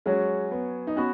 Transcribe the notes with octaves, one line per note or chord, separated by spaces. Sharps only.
F#3 G#3 C#4 F#4 C#5
B3
D#4
B3 C#4 F#4